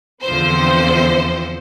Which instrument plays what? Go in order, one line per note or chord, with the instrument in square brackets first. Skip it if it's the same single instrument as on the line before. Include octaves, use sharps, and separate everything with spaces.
[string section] E2 D3 F3 C4 C5